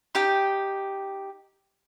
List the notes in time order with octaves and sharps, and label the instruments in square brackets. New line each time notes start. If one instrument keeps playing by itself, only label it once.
[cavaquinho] D#4 G4 G5